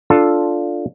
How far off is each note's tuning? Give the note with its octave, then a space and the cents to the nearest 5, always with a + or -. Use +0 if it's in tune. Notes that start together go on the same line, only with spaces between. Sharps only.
D4 +0 F4 +0 A4 +0